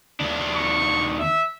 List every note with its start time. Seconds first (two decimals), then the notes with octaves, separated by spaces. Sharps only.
0.20 D#2 D4
0.55 C#6
1.19 E5